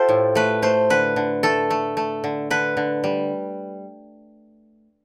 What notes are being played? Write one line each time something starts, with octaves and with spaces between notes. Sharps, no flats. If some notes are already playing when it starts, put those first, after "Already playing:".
Already playing: F4 G4 A4 C5
A2
A3 B4
A3 C5
D3 B4
D3
A3 A4
A3
A3
D3
D3 B4
D3
G3